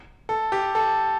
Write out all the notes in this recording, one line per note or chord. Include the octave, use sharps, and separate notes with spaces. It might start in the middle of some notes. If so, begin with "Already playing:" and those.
A4
G4
A4